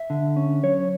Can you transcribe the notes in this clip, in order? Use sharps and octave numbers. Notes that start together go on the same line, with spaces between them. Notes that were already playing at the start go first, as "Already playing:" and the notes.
Already playing: E5
D3
C#4
F#3 C#5